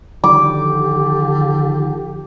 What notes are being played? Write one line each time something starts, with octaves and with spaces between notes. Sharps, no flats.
D3 D#3 F3 G4 D6